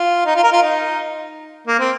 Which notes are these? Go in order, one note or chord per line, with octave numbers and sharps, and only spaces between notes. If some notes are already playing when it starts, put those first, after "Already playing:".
Already playing: F4
D#4
F4
A#4
F4
D#4
A#3
C4